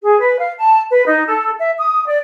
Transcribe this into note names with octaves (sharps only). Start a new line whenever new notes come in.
G#4
B4
F5
A5
B4
D#4
A4
E5
D#6
D5